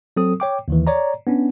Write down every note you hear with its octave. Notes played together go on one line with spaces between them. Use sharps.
F#3 C4 A4 D#6
C#5 G5 D6
D#2 D#3 E3
C#5 D5 A#5
B3 C#4 D4